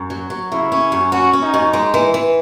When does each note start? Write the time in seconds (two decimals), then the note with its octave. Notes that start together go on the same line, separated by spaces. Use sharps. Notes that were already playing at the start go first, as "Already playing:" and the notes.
Already playing: F#2
0.10 F#3
0.30 F#3
0.51 C#3 E4
0.72 C#4
0.92 F#2
1.12 C#4 F#4
1.33 C#4
1.42 D#4
1.54 F#2
1.73 G#3
1.94 E3
2.14 E3